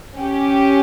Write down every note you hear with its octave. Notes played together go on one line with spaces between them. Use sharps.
C#4 G4